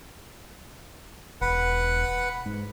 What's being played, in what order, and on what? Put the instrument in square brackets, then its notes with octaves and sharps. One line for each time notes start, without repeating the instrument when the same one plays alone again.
[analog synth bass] E1 [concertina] B4 F#5
[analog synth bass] G#2